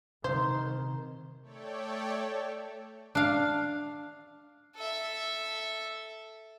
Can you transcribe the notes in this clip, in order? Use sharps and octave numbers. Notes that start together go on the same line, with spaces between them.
C3 D#3 C5
A3 A4 C#5 D5 G5
D4 F5
A4 E5